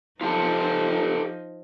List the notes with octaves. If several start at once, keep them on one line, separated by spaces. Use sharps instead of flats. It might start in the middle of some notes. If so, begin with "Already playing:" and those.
F3 D#4 F4 G4 A4